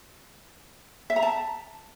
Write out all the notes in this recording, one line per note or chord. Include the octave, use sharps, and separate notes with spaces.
E5
A#5
A5